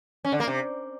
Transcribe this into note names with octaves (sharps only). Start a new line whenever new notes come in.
C#4
D3
A#3
C3